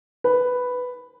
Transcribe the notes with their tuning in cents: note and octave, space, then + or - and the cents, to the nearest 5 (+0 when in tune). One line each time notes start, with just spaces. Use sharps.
B4 +5